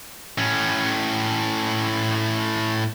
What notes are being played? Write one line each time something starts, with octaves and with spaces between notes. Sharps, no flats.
A2 C#4